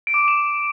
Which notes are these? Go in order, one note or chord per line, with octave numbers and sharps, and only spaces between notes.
D7
D6
D7
E7